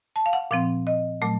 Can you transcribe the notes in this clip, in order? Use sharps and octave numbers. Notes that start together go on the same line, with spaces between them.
A5
F5
F#5
A#2 F3 C4 F5
D#5
A#2 F#3 A3